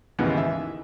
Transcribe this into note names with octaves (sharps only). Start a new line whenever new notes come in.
D#2 G#2 C#3 E3 B3
E5